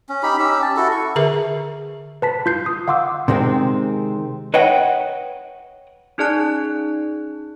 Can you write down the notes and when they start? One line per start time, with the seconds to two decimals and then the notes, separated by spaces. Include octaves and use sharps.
0.09 C#4
0.23 D#4 G4 B5
0.39 C#4 G4 E6
0.62 A5
0.77 E4 F#4 A4
0.91 C#6
1.16 D3 G#4 A#4 E5
2.22 B4 A5 B6
2.46 F4 G6 C7
2.66 D#6
2.88 F5 F#5 C6 D6 E6
3.28 C3 D#3 G#3 C4
4.54 B4 C#5 D#5 F#5 G5
6.18 C#4 D#4 G#4 D5 A5 F#6